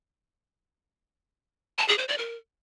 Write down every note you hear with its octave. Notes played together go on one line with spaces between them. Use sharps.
A5
G#4
C5
D5
A#4